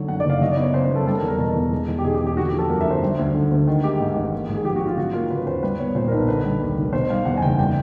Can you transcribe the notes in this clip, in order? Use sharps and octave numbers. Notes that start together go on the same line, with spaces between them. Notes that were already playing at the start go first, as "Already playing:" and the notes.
Already playing: D3 F#3
F#2 F#5
D5
F#1
F5
F#3 D#5
D5
B3
C#5
C#3 C5
B4
F#2
A4
G3 A4
A#4
E2
A#4
B2 A4
E2
G#3
E2
G4
B2 G#4
G4
E2
G4
D3 F#4
G4
F3
A4
F#2 A#4
E5
G1 C5
G3
D2
D3
D2
D#3
G#3 G4
G#2
A1
A#3
G#2
G#4
F3 G4
F#4
G#2
F4
F#3 F#4
A#3 F4
C#3 B4
B4
D#2 C5
G3 B4
B3 C#5
A#2 C5
A#4
B1 B4
D3 B4
G3
D#2
F1
B2 C5
G3 F5
E2 F#5
G#5
F#1 G5
G3 G5